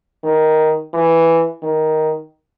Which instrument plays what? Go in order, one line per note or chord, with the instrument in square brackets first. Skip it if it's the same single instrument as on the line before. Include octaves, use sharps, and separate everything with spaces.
[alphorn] D#3
E3
D#3